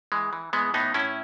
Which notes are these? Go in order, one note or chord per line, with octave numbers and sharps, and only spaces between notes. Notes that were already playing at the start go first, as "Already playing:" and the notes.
E3 G#3
E3
E3 G#3 B3
A2 B3 D#4
A2 C#4 E4